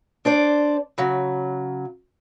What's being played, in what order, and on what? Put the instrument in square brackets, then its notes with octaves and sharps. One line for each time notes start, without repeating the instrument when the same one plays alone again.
[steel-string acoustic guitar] D4 C5 D5
C#3 F#3